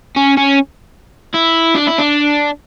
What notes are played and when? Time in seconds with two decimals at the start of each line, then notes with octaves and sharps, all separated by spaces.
0.16 C#4
0.37 C#4
1.35 E4
1.74 D4
1.87 E4
1.98 D4